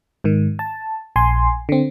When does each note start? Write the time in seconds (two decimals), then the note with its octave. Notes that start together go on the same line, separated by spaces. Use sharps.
0.24 G#2 D#3
0.59 A5
1.16 A#1 G#5 C6
1.69 D3 C4